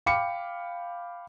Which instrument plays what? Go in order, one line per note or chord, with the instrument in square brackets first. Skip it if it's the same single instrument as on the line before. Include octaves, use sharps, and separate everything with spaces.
[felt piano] F5 G5 B5 D6 C#7